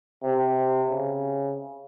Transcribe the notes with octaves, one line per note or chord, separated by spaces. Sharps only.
C3
C#3